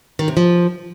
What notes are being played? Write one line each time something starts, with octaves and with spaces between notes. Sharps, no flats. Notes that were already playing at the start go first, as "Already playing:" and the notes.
D#3
C3
F3